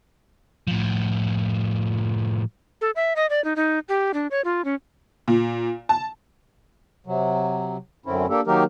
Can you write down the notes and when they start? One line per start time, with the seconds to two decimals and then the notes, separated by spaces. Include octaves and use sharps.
0.68 A2 F3
2.81 A4
2.96 E5
3.16 D#5
3.30 D5
3.44 D#4
3.56 D#4
3.89 G4
4.14 D4
4.31 C#5
4.45 F4
4.65 C#4
5.28 A#2
5.89 A5
7.07 C3 F#3
8.06 F#2 D3 C4 C#4 E4
8.29 A#3 D4 G4 A4
8.47 D#3 F#3 A#3 D#4 G4 A#4